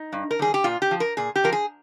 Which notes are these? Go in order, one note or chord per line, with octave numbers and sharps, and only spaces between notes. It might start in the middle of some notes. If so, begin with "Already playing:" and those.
Already playing: D#4
G2
A#4
D#3 G3 G#4
G4
A#2 F4
G4
F3
A#4
A#2 G#4
G4
F3 A#4
G#4